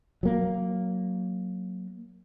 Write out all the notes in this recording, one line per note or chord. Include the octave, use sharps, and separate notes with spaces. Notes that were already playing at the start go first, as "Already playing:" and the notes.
F#3 A#3